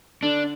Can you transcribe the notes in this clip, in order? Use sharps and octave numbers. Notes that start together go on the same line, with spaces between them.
D3 D4